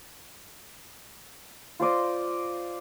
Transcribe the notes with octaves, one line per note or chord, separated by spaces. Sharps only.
F4 C5 D5 D#5